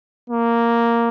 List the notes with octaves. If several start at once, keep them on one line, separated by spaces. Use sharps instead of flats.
A#3